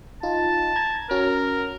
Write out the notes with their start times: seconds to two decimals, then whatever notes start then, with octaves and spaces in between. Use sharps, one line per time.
0.23 D#4 F4 A5
0.76 A#5 G#6
1.11 C#4 F#4 A#4